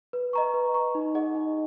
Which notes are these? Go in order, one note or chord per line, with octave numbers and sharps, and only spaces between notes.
B4
D#5 A#5 C#6
B4
D#5 A#5 C#6
D#4
G#4 D#5 F#5 C#6
D#4